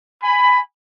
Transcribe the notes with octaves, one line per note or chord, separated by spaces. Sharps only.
G#5 B5